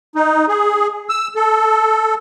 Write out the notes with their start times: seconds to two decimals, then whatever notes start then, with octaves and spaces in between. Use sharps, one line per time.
0.15 D#4
0.48 G#4
1.09 E6
1.35 A4